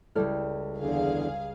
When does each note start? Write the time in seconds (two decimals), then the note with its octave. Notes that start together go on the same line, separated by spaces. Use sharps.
0.15 C#2 G3 E4 A4 D5 F6
0.78 E2 D3 G#4 F5